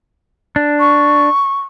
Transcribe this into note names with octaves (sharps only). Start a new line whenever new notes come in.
D4
C#6